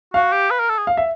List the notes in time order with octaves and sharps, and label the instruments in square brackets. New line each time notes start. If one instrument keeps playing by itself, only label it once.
[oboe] F#4 [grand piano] F5
[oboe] G4
B4
A#4
A4
G#4
[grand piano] F5
E5